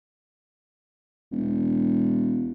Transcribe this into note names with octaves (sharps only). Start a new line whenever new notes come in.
E1